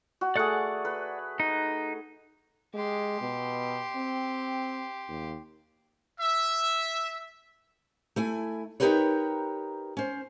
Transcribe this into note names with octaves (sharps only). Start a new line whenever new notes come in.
F#4
A3 G#4 D5 F#5 F#6
B4
D#4
G#3 G4 C6
B2
C4
D#2
E5
A3 E4 G#5
D#4 F4 G4 A#4 B4 C#5
C#4 C5